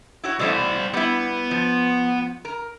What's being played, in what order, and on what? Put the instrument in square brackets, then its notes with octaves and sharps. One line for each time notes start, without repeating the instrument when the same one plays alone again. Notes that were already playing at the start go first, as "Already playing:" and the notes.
[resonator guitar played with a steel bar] E4 F#4 C#5
[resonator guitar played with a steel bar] B2 E3 A3 [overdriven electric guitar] G3 C5
[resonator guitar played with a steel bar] G3 E4 [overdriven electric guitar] B3
[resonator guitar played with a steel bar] F3
A#4